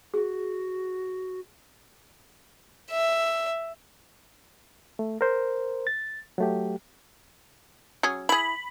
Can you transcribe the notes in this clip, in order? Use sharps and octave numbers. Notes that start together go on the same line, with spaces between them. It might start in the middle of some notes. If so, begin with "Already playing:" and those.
F#4 G#4
E5
A3
A#4 C5
A6
F#3 A3 G4
F#3 C#4 G#4
E4 G#4 B5